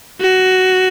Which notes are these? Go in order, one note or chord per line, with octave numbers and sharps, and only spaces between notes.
F#4